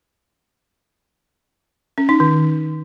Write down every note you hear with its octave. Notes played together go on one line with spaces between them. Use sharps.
C#4
D#4
D#3